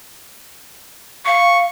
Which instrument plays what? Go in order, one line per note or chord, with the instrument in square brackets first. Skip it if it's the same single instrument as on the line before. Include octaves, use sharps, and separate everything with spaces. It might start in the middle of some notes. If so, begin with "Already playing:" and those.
[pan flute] F5 [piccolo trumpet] C#6